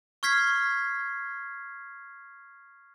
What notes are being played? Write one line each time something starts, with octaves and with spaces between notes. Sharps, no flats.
C#6 F6 G#6 B6 C7